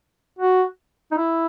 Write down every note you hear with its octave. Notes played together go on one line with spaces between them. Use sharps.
F#4
D#4
E4